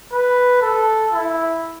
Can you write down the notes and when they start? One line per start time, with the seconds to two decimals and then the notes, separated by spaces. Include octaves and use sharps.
0.12 B4
0.61 A4
1.13 E4